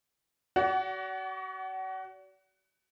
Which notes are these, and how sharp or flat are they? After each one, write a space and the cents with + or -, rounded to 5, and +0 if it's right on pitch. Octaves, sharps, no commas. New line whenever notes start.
F#4 +30 D5 -40 F#5 +15